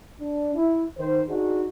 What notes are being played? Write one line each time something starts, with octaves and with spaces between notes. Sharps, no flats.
D4
E4
D#3 C5
D4 D#4 F#4 G#4